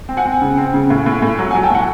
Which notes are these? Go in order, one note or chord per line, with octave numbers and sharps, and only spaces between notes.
C4
F#5 G#5
C4
C#3
C4
C#3
A2
A2
A2
F#3
F#3 F#5 G#5
G5 A5
A2 F#5 G#5